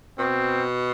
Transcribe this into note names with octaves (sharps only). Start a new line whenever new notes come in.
B2 C4